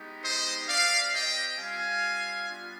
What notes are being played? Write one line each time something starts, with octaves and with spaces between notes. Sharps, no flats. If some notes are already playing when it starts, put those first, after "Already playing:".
Already playing: G#3 B3 D#4 G4
C5 D#5
C4 G4 D5 F5
D#5 G5
G3 C4 F4 F5 G#5
G3 B3 D4 F4